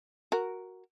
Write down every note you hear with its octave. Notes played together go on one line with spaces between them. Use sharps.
F#4 A#4